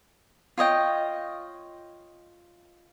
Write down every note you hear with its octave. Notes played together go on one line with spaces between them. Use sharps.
F4 C#5 D#5 G5